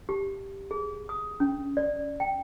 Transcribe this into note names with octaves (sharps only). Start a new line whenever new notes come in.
G4
G#4
D#6
C#4
D5
G5